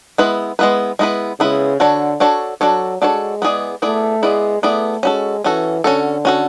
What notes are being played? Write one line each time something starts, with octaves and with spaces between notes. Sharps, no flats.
G#3 B3 E4 B4
G#3 B3 E4 B4
G#3 B3 E4 B4
C#3 G#3 B3 E4 B4
D3 D4 F#4 A4 C#5
D4 F#4 A4 C#5
F#3 D4 F#4 A4 C#5
G#3 D4 F#4 A4 C#5
B3 E4 G#4 D5
A3 B3 E4 G#4 D5
G#3 B3 E4 G#4 D5
A3 B3 E4 G#4 D5
G#3 C#4 F#4 A4
E3 C#4 F#4 A4
D3 C#4 F#4 A4
C#4 F#4 A4